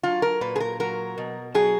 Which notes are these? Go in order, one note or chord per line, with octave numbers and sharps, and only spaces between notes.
F#3 F4
A#4
A#2 B4
G#4
A#4
F#3 A#4
B2
F#3 G#4